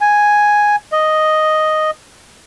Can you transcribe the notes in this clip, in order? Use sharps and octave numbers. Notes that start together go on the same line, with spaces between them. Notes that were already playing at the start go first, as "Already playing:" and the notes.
G#5
D#5